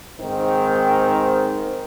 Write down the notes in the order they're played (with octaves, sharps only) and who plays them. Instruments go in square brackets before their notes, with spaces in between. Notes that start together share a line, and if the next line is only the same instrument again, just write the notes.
[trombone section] G#2 D#3 C4